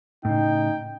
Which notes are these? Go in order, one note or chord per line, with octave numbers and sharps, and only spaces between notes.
A2 C#3 D#4 G5